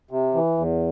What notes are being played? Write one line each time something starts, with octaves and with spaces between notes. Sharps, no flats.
C3
E3
E2